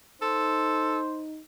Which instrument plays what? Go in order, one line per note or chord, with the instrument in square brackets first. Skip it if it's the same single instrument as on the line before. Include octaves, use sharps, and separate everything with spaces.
[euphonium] D#4 [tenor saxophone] A4 [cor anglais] C5